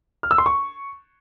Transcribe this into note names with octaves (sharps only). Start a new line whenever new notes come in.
F6
E6
C6
C#6